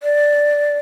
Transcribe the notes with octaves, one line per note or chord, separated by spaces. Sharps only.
D5